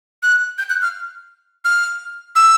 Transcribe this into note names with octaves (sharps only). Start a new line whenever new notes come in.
F#6
G6
F#6
F6
F6
E6